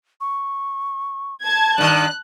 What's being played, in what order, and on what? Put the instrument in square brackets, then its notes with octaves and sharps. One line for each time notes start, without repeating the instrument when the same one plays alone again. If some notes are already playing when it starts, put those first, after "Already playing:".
[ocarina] C#6
[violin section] A5 G#6
[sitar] G2 D#3 [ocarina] D5 [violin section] F#6